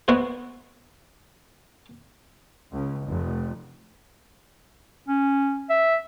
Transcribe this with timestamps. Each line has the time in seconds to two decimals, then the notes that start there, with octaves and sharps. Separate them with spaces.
0.08 B3 E4 F#4 C5
2.72 C#2
3.06 F1
5.08 C#4
5.70 E5